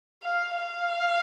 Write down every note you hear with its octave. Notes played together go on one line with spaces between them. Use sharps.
F5
F5